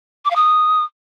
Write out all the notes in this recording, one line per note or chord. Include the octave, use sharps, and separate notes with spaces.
D6
F5
D#6